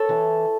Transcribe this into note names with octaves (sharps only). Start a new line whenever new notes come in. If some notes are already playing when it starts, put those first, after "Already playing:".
Already playing: A4 C#5
E3